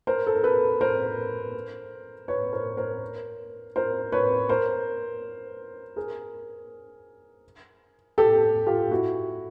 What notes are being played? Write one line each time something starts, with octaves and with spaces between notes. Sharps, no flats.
A#4 C5
A4
A#4
A4 B4
A#4 C5
B4 C#5
A#4 C5
A#4 C5
A#4 C5
B4 C#5
A#4 C5
G#4 A#4
G4 A4
F4 G4
E4 F#4